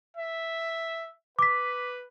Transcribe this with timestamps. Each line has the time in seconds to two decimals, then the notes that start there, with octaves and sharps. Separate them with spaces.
0.17 E5
1.39 B4 D6 B6